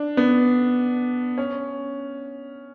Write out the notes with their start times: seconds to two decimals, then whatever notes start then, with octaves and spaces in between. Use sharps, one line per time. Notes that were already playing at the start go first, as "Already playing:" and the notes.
Already playing: D4
0.17 B3
1.38 C#4